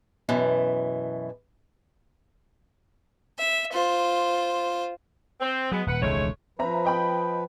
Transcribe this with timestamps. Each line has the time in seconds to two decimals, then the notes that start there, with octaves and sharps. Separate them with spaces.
0.29 F#2 B2 E3
3.39 E5
3.73 F4 C5
5.40 C4
5.72 F#3 G#3 B3
5.87 D#1 B4 F#5
6.01 E1 C#2 D#3 G#3 A3 C#5
6.59 F3 B4 C5 E5 A#5
6.85 D#5 G5 B5